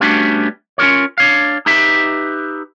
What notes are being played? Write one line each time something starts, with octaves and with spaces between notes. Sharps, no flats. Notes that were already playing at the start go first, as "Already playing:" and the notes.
G3 A3 B3 C#4 D4 F#4
C#4 F4 A#4 C#5
D4 C#5 F5
D#4 G4 B4 E5